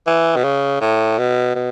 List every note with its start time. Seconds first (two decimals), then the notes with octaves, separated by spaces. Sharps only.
0.07 E3
0.36 B2
0.44 C#3
0.81 A2
1.18 B2
1.55 B2